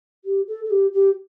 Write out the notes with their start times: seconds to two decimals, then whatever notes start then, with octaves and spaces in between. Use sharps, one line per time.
0.25 G4
0.48 A4
0.64 A4
0.70 G4
0.93 G4